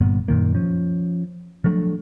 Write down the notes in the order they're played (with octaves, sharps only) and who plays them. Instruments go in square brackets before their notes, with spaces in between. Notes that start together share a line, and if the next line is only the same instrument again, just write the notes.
[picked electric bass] G1 G2 A#2 B3
F#2 A#2 D#3 A#3
F3 C#4
F3 F#3 A3 D4